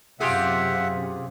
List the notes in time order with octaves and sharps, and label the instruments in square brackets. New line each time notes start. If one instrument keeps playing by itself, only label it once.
[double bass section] F#2 C3 [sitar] F4 G4 G#4 [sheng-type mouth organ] E5 F#5